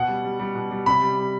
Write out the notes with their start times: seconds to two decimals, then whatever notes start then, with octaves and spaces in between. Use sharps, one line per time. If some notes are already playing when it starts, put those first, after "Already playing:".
Already playing: B2 F#5
0.08 G3
0.24 G3
0.39 G3
0.55 B2
0.71 G3
0.86 C3 B5
1.01 G3
1.17 G3